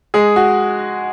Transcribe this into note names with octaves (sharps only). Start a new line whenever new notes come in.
G#3 G#4
F#4